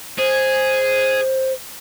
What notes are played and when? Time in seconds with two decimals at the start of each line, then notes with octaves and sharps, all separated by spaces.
0.18 G#4 C5